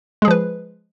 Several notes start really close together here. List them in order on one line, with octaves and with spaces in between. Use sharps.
G#3 G#4 F3 B4